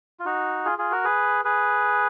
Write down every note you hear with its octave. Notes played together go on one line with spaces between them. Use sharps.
F4
D#4 F#4
F4 G#4
F4 G#4
F#4 A#4
G#4 B4
G#4 B4